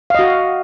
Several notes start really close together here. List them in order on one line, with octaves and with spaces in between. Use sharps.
F5 D#5 F#4